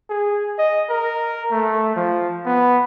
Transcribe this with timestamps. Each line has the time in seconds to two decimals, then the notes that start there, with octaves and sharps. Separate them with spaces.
0.10 G#4
0.59 D#5
0.90 A#4
1.52 A3
1.96 F3
2.46 B3